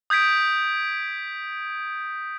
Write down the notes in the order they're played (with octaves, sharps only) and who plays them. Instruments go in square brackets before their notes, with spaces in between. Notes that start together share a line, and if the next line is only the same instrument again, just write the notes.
[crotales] D#6 G6 G#6 B6 D7